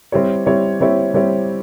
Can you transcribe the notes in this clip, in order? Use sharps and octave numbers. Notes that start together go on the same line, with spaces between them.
G3 C4 E4 G4 C#5
G3 C4 E4 G4 C#5
G3 C4 E4 G4 C#5
G3 C4 E4 G4 C#5